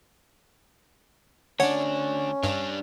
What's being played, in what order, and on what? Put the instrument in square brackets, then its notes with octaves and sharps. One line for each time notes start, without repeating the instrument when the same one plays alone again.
[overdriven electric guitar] D2 D4 [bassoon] C#4 [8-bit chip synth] C#5 F#5
[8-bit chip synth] G2 [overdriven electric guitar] G3 D4